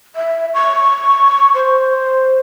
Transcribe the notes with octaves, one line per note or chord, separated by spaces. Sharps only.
E5
C#6
C5